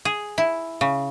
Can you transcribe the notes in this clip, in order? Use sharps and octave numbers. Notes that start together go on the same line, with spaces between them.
G#4
E4
C#3